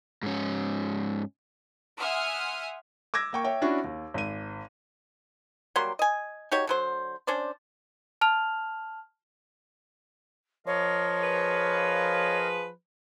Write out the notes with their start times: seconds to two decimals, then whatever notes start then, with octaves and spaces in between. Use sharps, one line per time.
0.23 G#2 C#4
1.98 E5 F#5 G#5 C6 D#6 F6
3.14 D6 E6 G#6 A#6
3.33 A#3 G5 C#6
3.44 C#5 E5 G5
3.62 C#4 D4 E4 F#4
3.84 D#2
4.14 G#1 D#7
5.76 F#3 G3 A#3 C6
5.99 D#5 G#5
6.52 D#4 F#4 G4 C#5
6.67 D3 F#3 C5
7.27 C#4 D4 C5 D5
8.21 A5 F6 F7
10.67 F3 A#4 C#5 D#5 F5
11.22 G#4 B4